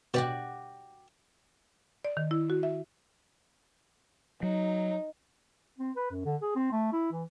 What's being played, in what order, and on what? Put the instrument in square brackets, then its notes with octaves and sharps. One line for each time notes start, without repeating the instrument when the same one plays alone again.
[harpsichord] B2 [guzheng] F#4 G4 D5
[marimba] D5
D#3
E4
F#4
E5
[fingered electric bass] F#3 [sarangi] D#4
[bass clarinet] C4
B4
F#2
D3
G#4
C4
A3
E4
E3